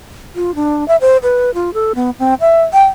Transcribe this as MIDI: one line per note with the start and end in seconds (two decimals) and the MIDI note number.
0.36 0.55 65
0.55 0.86 62
0.88 0.96 76
1.01 1.17 72
1.23 1.50 71
1.54 1.70 65
1.74 1.92 69
1.95 2.10 59
2.19 2.34 60
2.41 2.62 76
2.73 2.86 79